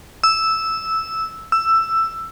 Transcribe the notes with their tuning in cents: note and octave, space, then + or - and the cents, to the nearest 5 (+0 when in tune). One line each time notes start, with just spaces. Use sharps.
E6 -5
E6 +10